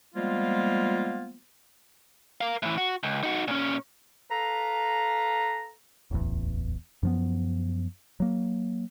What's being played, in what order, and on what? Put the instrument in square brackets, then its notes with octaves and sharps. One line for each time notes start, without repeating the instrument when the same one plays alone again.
[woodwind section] F3 G3 G#3 A#3 B3 F4
[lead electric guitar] A#4 F5
A2 E3
F#4
C#2
D#4 F#4
A#2 C#4
[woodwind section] A4 B4 F5 A#5
[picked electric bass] D1 A1 E2
F#2 F3 B3
F#3 A#3